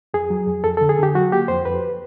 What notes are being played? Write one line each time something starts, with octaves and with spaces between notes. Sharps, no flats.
F2 G#4
F#3
F2
F2 A4
D3 A4
G#4
D3 G4
F#3 F#4
A#3 G4
F2 C5
F2 B4